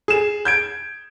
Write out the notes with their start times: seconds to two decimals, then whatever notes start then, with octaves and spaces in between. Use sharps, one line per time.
0.08 G#4 E7
0.45 G6 G#6 D7